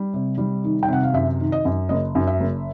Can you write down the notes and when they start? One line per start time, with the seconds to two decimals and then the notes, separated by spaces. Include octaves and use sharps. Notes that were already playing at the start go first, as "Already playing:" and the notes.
Already playing: G3
0.14 C3
0.38 G3
0.64 D#3
0.83 G5
0.88 C3 F#5
1.03 F5
1.13 F#2 E5
1.40 D#3
1.52 D#5
1.65 F#2
1.89 F#1 D#5
2.15 F#2
2.27 E5
2.40 F#1